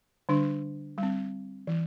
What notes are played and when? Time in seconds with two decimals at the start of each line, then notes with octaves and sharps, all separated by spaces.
0.29 D3 G3 D4
0.98 G3 C4
1.67 E3